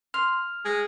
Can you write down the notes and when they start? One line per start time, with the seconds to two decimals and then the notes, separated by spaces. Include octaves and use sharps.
0.14 C6 F6
0.65 G#3